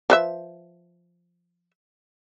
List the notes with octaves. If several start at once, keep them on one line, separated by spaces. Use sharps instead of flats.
F3 B4 E5